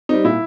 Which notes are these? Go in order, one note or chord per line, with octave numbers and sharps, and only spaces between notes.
G3 C4 D#4
A#2 E4